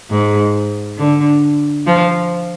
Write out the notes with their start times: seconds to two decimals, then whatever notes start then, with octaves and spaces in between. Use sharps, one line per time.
0.10 G#2
0.97 D3
1.86 F3